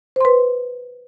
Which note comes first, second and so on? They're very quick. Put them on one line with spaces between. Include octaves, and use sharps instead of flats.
C5 C6 B4